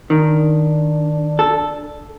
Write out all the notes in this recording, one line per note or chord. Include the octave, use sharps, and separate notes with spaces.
D#3 D4
A4